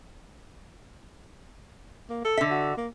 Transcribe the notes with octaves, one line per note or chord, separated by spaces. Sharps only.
A#3
A4
D3 E5
F#4
A#3